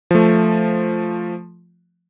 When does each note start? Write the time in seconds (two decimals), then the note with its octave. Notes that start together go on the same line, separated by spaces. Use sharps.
0.11 F3 A3